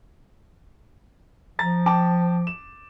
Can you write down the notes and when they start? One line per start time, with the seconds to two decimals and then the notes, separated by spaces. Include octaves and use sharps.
1.59 F3 A#5 A6
1.86 G5 A5 D6
2.47 E7